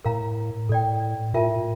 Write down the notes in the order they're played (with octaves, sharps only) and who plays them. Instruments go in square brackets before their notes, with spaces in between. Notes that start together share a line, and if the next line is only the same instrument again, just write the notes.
[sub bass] A2 [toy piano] A#4 F5 A#5
[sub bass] A2 [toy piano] A4 D5 G5
[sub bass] A2 [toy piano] F4 A#4 E5 A5